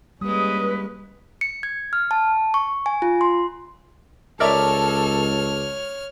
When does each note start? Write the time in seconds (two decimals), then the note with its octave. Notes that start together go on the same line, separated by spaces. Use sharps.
0.21 G3 G#3 A#3 C#4 B4 D#6
1.41 C#7
1.63 G#6
1.93 F6
2.11 A5
2.54 C#6
2.86 G#5
3.02 F4
3.21 C6
4.40 C#2 A4 A#4 C#5 D5 E5 F6